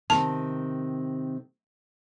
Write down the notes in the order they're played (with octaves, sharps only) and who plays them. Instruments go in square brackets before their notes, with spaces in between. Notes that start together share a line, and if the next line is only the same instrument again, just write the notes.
[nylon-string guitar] C3 D#3 [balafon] A5